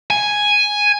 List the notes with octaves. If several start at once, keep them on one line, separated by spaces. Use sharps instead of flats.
G#5